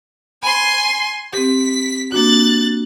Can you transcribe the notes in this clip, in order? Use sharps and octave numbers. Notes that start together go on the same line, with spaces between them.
G#5 B5 C6
C4 G4 B6
A#3 D4 F#4 F#6 A6